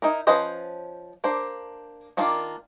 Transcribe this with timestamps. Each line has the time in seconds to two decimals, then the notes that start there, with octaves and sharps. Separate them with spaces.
0.02 D#4 E4 A#4
0.27 F3 C#4 B4 C5 D#5
1.24 A#3 D4 C5
2.17 D#3 A#3 D4 F4